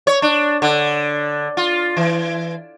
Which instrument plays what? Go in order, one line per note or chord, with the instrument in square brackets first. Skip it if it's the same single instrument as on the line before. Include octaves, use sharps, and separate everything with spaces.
[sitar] C#5
D4
D3
F4
E3